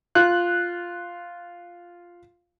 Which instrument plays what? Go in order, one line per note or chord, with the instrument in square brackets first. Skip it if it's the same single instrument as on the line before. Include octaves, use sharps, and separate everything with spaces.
[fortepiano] F4 F#6